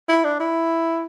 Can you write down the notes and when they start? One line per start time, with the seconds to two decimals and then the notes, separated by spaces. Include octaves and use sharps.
0.09 E4
0.24 D4
0.40 E4